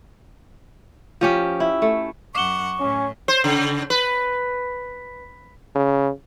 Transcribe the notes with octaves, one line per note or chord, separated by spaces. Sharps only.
F3 C#4 G4
E4
A3
F#2 F#5 C#6 D6 E7 G7
A2 C#4
C5
C#3
B4
C#3